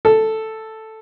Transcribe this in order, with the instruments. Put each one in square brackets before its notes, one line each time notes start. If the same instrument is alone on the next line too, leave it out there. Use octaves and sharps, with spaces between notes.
[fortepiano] A4